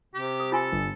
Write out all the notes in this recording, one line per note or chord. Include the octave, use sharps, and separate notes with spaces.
C3 G4
D#6
F4 A4 G#5 C6
G1